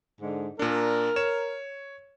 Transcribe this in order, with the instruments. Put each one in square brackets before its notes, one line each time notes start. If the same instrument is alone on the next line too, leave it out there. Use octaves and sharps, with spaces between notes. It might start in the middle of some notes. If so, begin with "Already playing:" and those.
[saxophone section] G#2 D3 G#3
[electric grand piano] A#2 D4 [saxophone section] A#4
[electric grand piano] C#5 E7